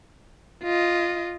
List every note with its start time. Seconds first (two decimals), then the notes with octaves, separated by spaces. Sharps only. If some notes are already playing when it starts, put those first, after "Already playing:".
0.64 F4 D#5